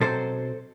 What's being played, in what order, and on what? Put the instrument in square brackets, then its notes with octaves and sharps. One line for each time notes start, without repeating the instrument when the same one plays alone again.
[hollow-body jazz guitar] B1 B2 F#3 C4 A4 C5